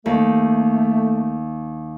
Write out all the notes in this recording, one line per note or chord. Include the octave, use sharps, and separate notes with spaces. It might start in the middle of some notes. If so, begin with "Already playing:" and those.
D#2 A3